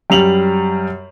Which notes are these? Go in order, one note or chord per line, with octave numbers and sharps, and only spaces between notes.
F#2 G3 F7 F#7